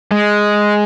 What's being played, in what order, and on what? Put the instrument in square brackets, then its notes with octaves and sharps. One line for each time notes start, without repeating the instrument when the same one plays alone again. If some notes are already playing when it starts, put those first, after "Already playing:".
[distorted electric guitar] G#3